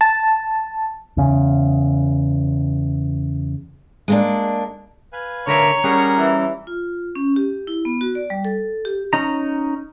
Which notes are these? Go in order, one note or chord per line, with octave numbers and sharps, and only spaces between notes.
A5
E2 C#3
G#3 A#3 D4
B4 F5 G#5
D3 A#4 C#5 E5 A#5
G3 C#4 G#4 A#4 F#5
E3
F4
C#4
G4
E4
B3
F#4
D5
G3
A4
G4
C#4 D#4 A#5